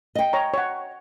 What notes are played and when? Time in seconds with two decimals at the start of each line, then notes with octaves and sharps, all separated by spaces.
0.15 D#5 G5
0.33 C#5 A#5
0.54 C#5 F#5